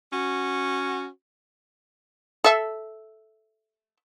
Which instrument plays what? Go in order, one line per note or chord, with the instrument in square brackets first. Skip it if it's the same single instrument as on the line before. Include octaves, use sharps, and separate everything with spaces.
[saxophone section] C#4 F#4
[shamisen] A4 E5